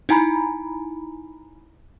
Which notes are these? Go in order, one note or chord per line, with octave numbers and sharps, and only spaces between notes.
D#4 E4 G#5 A#5 B5